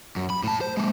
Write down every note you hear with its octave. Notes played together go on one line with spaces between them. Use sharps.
F#2
B5
A2 A5
C5
G#3 A#3